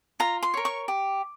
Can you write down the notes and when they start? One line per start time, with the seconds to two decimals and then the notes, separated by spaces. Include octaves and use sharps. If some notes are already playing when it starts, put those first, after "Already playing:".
0.20 F4 A#5
0.43 C6
0.54 A#4 C#5
0.65 C#6
0.88 G4